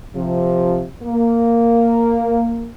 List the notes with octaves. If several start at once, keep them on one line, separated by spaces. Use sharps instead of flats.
C3 F3
A#3